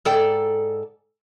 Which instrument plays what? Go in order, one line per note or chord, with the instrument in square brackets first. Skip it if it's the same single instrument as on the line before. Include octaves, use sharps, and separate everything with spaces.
[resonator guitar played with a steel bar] G#2 A4 D5 G5